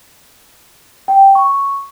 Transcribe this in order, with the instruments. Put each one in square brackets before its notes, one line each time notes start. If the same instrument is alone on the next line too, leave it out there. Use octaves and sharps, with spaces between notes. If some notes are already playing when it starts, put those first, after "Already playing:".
[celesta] G5
C#6